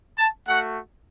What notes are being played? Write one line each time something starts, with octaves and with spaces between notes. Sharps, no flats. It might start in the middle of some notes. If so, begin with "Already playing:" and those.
A5
A3 F#4 F#5